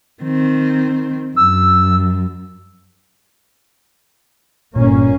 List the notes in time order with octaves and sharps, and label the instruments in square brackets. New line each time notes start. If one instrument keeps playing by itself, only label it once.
[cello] D#3 C4
[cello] F#2 [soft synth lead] E6
[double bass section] G1 A#3 C#4 [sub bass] A#2